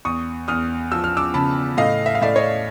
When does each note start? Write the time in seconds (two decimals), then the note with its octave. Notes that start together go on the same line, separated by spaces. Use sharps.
0.05 E2 C#6 D#6
0.48 E2 D#6 F6
0.92 F3 E6
1.04 F6
1.17 D6 E6
1.34 C#3 A5 B5
1.77 A2 D#5 F5
2.06 E5
2.15 F5
2.21 A2 D5 E5
2.36 C#5 D#5